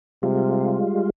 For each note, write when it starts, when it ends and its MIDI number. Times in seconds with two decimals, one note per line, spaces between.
0.23 0.80 48
0.23 1.10 55
0.23 1.10 56
0.23 1.10 65